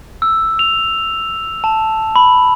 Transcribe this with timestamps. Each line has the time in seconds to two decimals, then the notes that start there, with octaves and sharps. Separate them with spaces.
0.22 E6
0.59 F7
1.64 A5
2.16 B5